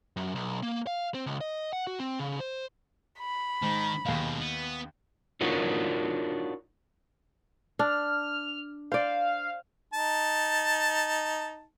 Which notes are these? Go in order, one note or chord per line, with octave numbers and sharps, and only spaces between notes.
F#2
B1
A#3
F5
C4
C#2
D#5
F#5
F#4
C4
C#3
C5
B5
G#2 D#3
D#2 B2 G#3 F5
B3
D4 D#4 F4 F#4 A#4 C#5
D4 F6
C5 D5 F5
D#4 A5